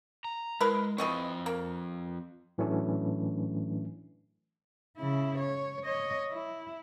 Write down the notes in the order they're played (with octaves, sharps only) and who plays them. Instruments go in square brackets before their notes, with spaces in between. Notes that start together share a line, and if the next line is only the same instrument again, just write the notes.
[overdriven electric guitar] A#5
[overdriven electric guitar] G#3 [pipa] E4 A#4 B4
[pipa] E3 D#5 C#6 [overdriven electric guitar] F3 C4
[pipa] A#3
[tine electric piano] A2 E3 F#3 A3 C#4 D4
[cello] C#3 E4
C#5
C#5 D#5
E4